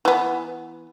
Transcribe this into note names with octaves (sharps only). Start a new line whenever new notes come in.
E3 B3